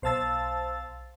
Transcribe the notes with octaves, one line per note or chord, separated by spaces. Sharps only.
B1 C5 F5 A5 E6 A6